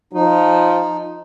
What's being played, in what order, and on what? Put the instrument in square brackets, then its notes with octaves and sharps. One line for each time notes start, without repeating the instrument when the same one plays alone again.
[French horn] F3 [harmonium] D#4